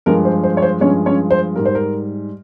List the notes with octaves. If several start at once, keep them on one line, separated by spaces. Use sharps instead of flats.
G2 F3 G#3 A#4
C5
C5
C#5
C5
G2 F3 G#3 C#4 C#5
C#4 C#5
C5
G#2 G3 A#4
C5
A#4